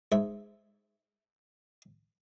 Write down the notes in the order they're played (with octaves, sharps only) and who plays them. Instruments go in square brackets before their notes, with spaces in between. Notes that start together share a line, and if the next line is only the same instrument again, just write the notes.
[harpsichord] G#2 E5